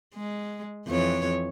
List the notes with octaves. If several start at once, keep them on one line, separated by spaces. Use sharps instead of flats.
G#3
F2 E3 C#5